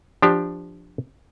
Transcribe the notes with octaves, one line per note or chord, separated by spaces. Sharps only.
F3 D4 G4